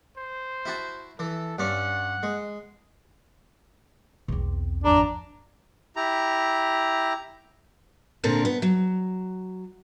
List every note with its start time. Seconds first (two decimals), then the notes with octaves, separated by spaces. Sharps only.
0.17 C5
0.65 E4 F#4 A5
1.19 E3 A4
1.59 G2 C#4 F#5
2.23 G#3
4.28 B1 E2 C4
4.84 G#1 F2 D4 A#5
5.96 E4 G4 A#5
8.24 A#2 D3 C4 A4 A#4
8.45 B3
8.62 F#3